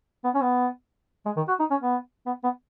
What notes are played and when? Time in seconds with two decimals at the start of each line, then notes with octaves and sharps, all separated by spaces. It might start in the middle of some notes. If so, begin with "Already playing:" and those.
0.24 B3
0.35 C#4
0.41 B3
1.26 G#3
1.36 D#3
1.48 F#4
1.59 D#4
1.70 C#4
1.82 B3
2.26 B3
2.44 B3